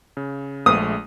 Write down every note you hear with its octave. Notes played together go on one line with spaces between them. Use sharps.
C#3
A#1 G#3 A3 D#6